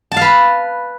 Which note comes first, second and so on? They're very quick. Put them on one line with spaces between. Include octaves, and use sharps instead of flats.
A5 F5 B4